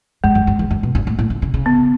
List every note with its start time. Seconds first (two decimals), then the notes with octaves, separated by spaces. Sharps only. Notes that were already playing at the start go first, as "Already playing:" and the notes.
0.24 F#2 G#3
0.35 F#2
0.47 F#2
0.59 E2
0.71 F#2
0.83 B2
0.95 F#2
1.07 A2
1.19 A2
1.30 C#3
1.42 C#3
1.54 C#3
1.66 B3